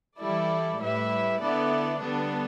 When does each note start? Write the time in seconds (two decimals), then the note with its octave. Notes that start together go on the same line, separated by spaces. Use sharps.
0.19 E3 G3 E4 A4 D5
0.80 A2 G3 E4 B4 E5
1.40 D3 B3 E4 A4 D5
2.01 D3 G3 B3 D4 A4